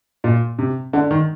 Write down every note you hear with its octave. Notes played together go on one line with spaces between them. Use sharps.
A#2
C3
D3
D#3